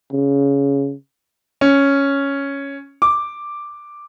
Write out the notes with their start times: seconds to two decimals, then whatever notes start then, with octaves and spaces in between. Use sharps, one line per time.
0.13 C#3
1.61 C#4
3.02 D6